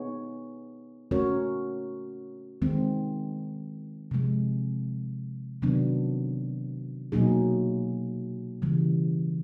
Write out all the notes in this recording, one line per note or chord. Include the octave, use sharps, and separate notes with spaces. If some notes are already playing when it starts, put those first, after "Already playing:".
Already playing: B3 D#4 G#4 C#5
A3 C#4 F#4 A#4 C#5
D#3 G#3 C4
C3 F3 G#3
C3 D#3 F#3 B3 D4
B2 F#3 A#3 D#4 G#4
C#3 E3 G3